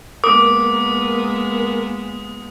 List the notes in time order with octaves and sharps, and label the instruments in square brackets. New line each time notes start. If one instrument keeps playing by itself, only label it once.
[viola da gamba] G#3 A#3 B3 [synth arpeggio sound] A#4 [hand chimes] D6 [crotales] D#6